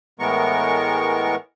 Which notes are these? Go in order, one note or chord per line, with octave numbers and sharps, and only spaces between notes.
A2 E3 G#3 B3 A#4 C#6